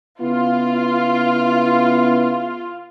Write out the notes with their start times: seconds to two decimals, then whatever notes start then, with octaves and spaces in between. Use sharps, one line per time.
0.21 C#3 B3 E4 F4